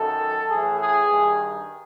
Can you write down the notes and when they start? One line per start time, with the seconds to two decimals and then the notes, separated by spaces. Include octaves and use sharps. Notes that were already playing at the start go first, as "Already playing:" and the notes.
Already playing: F#2 D#3 A4
0.49 A2 E3 G#4
0.79 G#4
1.09 G2 D#3